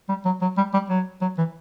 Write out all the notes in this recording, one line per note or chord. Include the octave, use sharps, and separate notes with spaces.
G3
F#3
F#3
G3
G3
F#3
F#3
E3